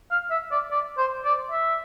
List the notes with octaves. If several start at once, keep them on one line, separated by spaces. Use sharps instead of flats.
F5
E5
D5
D5
C5
D5
E5